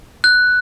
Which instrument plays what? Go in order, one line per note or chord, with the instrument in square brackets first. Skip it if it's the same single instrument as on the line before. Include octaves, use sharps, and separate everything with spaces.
[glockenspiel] F#6